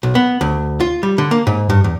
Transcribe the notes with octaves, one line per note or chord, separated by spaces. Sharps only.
B1
B3
D2
F4
G3
D3
A#3
G#2
G2
E2